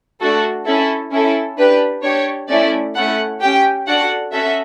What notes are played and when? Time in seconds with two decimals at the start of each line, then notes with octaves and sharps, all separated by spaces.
0.20 A3 D4 F#4 A4
0.66 C#4 E4 A4
1.12 C#4 E4 A4
1.58 D4 G4 B4
2.03 D4 G4 C#5
2.49 A3 C#4 E4 D5
2.95 A3 C#4 E4 A4 F#5
3.41 C#4 G4 G5
3.87 D4 F#4 A4 F#5
4.32 C#4 F#4 A4 E5